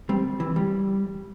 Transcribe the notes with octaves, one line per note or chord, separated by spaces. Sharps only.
G3 C4
E3
G3